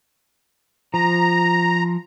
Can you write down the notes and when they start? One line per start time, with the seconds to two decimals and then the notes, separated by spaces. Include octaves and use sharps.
0.94 F3 A#5